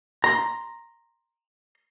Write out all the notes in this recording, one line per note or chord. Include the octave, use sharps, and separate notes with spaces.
A#5 C6